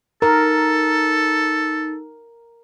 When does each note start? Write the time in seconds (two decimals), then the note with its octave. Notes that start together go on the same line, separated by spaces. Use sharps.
0.22 D#4 A4 A#4